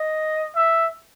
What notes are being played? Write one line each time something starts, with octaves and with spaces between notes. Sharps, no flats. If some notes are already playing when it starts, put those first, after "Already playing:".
Already playing: D#5
E5